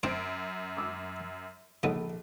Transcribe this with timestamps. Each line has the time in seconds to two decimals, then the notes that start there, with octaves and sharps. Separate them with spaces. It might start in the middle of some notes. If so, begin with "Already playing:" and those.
0.03 F#2 C4 D4 C5 D7
0.77 D6 E6
1.83 A#1 C#3 B3 D#4 A4